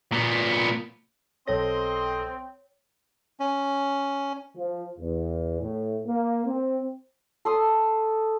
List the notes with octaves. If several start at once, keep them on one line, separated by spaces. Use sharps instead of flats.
A#2 B3
B1 C4 A4 C#5 D#5 C6 A#6
C#4
F3
E2
A2
A#3
C4
A4 C6 D#6